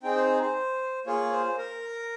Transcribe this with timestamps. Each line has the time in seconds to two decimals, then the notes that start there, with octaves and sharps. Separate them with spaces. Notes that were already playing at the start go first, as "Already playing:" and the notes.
0.03 C4 D#4 G#4 G5
0.16 C5
0.41 C5
1.06 A#3 F4 G#4 C#5
1.32 C5
1.58 A#4